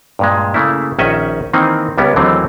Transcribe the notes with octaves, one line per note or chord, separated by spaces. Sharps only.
G2 A#2 G#3
C#3 A3 A#3 E4
A#1 D#3 C#4 D#5 E5 F#5
D#3 E3 A#3 C4 D#4
C#2 G3 B3 C#4 A#4
D#2 D3 E3 F#3 A3 C4